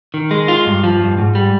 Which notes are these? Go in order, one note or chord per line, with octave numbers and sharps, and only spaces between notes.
D#3
G#3
F4
G2
F3
G2
G#2
G3